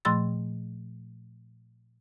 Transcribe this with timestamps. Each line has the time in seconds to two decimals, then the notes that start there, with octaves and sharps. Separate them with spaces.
0.05 A#2 F3 A3 C6 E6 A6